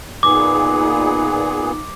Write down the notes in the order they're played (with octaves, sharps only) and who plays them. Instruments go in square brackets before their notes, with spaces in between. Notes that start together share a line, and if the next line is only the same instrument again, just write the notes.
[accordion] A#2 B3 G#4 [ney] D#4 [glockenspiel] D6